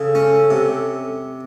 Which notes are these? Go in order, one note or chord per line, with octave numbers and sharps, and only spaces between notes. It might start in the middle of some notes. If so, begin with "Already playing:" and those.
Already playing: C#3 A4
C#4
C3